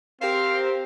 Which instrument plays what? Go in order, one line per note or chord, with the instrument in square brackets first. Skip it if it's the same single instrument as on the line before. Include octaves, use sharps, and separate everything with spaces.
[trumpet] C4 [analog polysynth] G4 A#4 C5 [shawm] F5